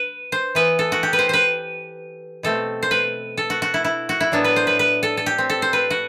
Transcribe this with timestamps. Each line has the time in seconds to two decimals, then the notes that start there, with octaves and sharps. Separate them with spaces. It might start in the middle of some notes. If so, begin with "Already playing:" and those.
Already playing: B4
0.32 C5
0.55 E3 B3 B4
0.79 A4
0.92 F#4
1.03 G4
1.13 B4
1.19 C5
1.29 B4 C5
2.43 B2 A3 C4 A4
2.83 C5
2.91 B4
3.37 A4
3.50 F#4
3.62 F#4
3.74 E4
3.85 E4
4.09 F#4
4.20 E4
4.32 A2 F#3 B3 D4
4.44 B4
4.56 C5
4.67 B4
4.79 B4
5.03 A4
5.17 A4
5.26 G4
5.38 C4
5.50 A4
5.62 C5
5.73 B4
5.90 F#4